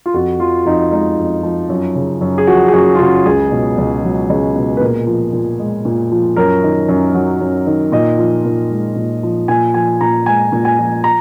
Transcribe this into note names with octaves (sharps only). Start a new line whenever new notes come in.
F4
F2 F#4
F3 F4
F2 D#4
G#3 D#4
F2
F3
F#2
C#3
F#2
G#4
F3 F#4
G#4
F#2 F#4
F4
C#3 F#4
C#2 G#4
B2
C#2
F#3
C#2
B2
B4
A#2 A#4
F3
A#2
G#3
A#2
F3
F#2 A#4
D#3
F#2
F#3
F#2
D#3
A#2 D#5
F3
A#2
G#3
A#2
F3
A#2 G#5
F3 G#5
A#2 A#5
G#3 G#5
A#2
G#5
F3
A#5